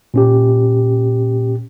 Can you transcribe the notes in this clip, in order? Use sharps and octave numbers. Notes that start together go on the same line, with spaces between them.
A#2 C#4 G4